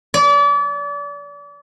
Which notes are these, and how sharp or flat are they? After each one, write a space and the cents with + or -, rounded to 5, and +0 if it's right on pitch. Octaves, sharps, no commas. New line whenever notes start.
D5 -35